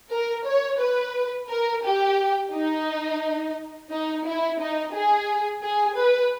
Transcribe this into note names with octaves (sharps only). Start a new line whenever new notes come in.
A#4
C#5
B4
A#4
G4
D#4
D#4
E4
D#4
G#4
G#4
B4